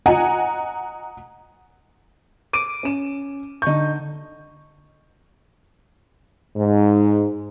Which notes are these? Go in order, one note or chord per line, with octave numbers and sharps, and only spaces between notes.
D#5 F#5 G#5 A#5
D6 D7 D#7
C#4 E7
D3 D#4 C#6 G6
G#2